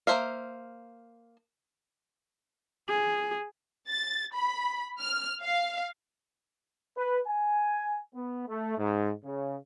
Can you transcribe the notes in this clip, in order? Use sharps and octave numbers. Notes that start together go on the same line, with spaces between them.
A#3 F#4 C5 E5 F5
G#4
A6
B5
F6
F5
B4
G#5
B3
A3
G#2
C#3